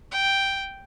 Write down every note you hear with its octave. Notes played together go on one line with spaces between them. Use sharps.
G5